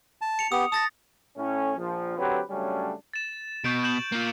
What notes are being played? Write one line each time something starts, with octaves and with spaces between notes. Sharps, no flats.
A5
C#7 F7
B3 G4 D#6
A5 D#6 A6 A#6
A2 C#4
A#1 F3
D3 F#3 C4 G4 B4
C#3 F#3 G3 A3 C#4 D4
A6 E7
B2 C#6 G6 D7
G6 E7 F#7
A#3 F4